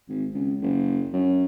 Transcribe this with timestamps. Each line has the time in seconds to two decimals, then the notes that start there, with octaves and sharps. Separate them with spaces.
0.09 G#1
0.34 C#2
0.62 F#1
1.13 F#2